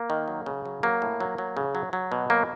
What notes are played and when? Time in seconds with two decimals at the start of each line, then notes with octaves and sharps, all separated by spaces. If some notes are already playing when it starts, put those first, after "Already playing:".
Already playing: A#3
0.10 D#3
0.28 F#3
0.46 C#3
0.65 F#3
0.83 F#3 A#3
1.02 A2
1.20 F#3
1.38 F#3
1.57 C#3
1.75 F#3
1.93 F#3
2.12 B2
2.30 F#3 A#3